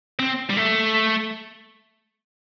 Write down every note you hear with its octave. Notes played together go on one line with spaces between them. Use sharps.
C4
G3
A3